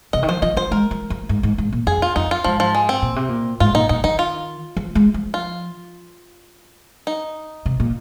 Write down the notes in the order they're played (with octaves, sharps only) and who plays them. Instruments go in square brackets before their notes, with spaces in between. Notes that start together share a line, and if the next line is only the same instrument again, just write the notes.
[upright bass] C3 [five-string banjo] D#5
[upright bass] D#3
[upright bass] F3 [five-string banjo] C5
[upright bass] F3 [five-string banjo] D#5
[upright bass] F3 [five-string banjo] C5
[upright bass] G#3 [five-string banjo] A#4
[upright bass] F3
F3
G#2
G#2
G#2
A#2
[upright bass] F2 [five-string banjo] G#4
[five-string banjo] F4
[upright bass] F2 [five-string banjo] D#4
[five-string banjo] F4
[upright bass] G#2 [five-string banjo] F3
[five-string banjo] F3
G#3
C4
[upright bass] A#2
C3
A#2
[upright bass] G#2 [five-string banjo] F4
[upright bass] A#2 [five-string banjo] D#4
[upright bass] A#2 [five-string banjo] D#4
[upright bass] D#3 [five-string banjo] D#4
[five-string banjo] F4
[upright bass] F3
G#3
F3
[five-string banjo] F4
D#4
[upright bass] C3
A#2